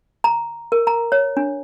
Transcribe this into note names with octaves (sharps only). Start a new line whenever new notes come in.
A#5
A#4
A#5
C#5
D4